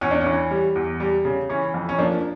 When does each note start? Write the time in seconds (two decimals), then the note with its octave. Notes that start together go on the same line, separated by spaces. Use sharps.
0.01 E2 C#4
0.11 D4
0.21 C#4
0.26 E3
0.51 G3
0.75 E2
1.00 G3
1.25 C#3
1.49 E3 C#4
1.74 F2
1.89 C#4
1.99 F3 A#3 D4